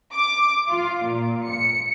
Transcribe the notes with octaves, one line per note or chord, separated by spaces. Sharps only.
D6
F4
A#2
C#7